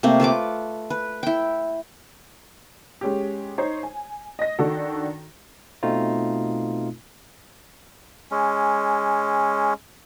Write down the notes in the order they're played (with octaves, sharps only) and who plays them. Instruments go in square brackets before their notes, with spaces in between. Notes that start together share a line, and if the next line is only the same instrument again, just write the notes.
[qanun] C3 A3 A#3 C4
F4 A4 B4 D6
B4
E4 G5
[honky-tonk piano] G#3 C#4 G4
D#4 C5 C#5
G#5
D#5 A#6
D#3 D4 F#4 A4
[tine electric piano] B2 A3 C4 D#4 F4
[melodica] G#3 C#4